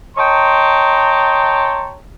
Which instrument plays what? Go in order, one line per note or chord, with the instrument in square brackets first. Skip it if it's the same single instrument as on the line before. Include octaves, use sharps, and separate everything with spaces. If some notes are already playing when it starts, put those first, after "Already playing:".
[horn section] C#5 D#5 G5 A5 A#5 C6